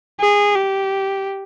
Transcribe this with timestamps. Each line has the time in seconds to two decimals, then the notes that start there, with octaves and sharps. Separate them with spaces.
0.20 G#4
0.55 G4